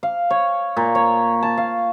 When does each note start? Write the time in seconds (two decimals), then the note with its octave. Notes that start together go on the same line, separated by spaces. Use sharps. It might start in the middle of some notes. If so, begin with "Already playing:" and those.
0.03 F5
0.30 C#5
0.77 A#2
0.95 C#5
1.43 A5
1.58 F5